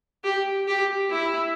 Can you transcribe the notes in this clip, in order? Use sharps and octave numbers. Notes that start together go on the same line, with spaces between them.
G4
G4
E4